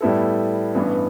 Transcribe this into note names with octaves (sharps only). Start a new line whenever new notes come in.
A2 G3 B3 E4 A4
A1 G2 E3 B3